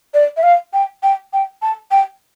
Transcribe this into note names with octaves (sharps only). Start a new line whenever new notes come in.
D5
E5
F5
G5
G5
G5
A5
G5